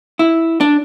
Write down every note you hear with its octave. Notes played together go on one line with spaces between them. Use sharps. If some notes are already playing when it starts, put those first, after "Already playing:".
E4
D4